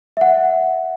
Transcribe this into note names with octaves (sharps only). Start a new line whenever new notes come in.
E5 F#5